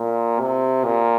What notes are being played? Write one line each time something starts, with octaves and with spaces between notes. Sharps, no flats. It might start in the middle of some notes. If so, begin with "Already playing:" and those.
Already playing: A#2
C3
A#2